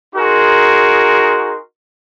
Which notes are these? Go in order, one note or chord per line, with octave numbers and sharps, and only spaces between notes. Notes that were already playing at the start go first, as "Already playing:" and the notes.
D#4 F#4 G#4 A#4 C6